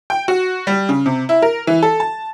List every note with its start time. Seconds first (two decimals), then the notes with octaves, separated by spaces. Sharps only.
0.10 G5
0.28 F#4
0.67 G3
0.89 C#3
1.06 C3
1.29 E4
1.42 A#4
1.67 E3
1.82 A4
2.00 A5